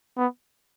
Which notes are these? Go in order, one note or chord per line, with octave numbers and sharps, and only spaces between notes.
B3